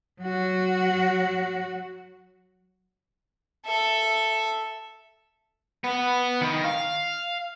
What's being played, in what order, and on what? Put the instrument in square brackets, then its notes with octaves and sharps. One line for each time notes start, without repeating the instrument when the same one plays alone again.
[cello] F#3 F#4
[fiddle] A4 E5
[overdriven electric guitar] B3
D#3
F5